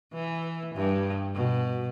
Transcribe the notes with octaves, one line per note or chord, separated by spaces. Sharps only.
E3
G2
B2